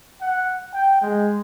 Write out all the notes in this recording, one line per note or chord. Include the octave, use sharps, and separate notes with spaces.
F#5
G5
G#3